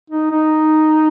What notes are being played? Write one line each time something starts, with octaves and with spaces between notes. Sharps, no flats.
D#4
D#4